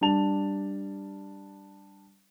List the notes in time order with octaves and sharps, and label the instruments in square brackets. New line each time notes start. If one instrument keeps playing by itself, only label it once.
[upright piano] G3 D4 A5 F7